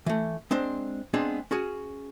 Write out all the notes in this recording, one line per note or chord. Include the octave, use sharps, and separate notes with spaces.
E3 A3
G#3 C4 D4 C5
G#3 B3 C4 D4 G#4
C#4 F#4 G#4